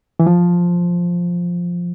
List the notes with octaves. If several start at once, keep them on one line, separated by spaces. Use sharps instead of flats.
E3
F3